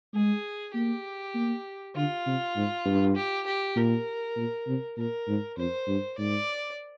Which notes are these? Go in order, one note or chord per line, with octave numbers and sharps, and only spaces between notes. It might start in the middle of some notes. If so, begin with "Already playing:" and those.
G#3 G#4
A#3 G4
A#3
D3 F4
C3
G#2
G2
G4
G4
A#2 A#4
A#2
C3
A#2 A#4
G#2
F2 C5
G2
G#2 D5